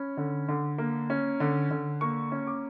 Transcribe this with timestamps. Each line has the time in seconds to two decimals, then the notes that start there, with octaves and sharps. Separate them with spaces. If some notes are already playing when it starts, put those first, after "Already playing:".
Already playing: C#4 B5
0.17 D3
0.48 D3
0.78 A#3
1.10 C#4
1.40 D3
1.71 D3
2.01 A#3 C#6
2.32 C#4
2.47 D6